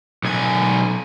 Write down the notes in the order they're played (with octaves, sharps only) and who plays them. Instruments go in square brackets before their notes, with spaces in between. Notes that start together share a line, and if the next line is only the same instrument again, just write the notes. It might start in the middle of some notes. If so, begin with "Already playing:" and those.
[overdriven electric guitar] B1 G#5